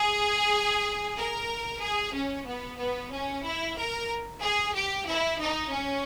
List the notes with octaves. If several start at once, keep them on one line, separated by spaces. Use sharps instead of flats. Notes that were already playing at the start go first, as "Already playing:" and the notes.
Already playing: G#4
A#4
G#4
C#4
B3
B3
C#4
E4
A#4
G#4
G4
E4
D#4
C#4